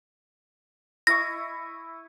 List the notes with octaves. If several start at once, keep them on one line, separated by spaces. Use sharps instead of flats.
E4 D#5 C#6 A#6